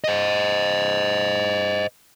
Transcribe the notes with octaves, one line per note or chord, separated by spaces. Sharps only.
C5 D#5